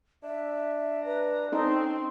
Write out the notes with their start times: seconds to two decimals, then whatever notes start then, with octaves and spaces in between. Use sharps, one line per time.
0.23 D4 E5
1.05 B4 A#5
1.52 C4 C#4 D#4 A4 C6